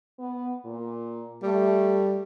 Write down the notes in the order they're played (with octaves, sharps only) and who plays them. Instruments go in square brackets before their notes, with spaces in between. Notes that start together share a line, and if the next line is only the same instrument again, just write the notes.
[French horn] B3
A#2
[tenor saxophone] G3 [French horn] A3